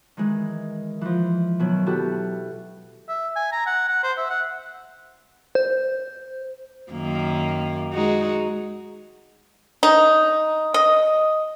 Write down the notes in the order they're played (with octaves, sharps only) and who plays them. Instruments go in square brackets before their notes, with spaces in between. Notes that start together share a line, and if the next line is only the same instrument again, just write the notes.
[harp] D#3 E3 G#3
E3 F3
B2 D#3 F#3
B3 E4 F#4 G4 A4
[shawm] E5
G#5
A#5
F#5
F#5
C5
E5
F#5
[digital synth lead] C5
[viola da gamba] F#2 D#3 A#3
G#3 D#4 F#4
[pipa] D#4
D#5